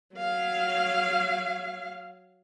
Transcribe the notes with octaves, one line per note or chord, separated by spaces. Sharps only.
F#3 F5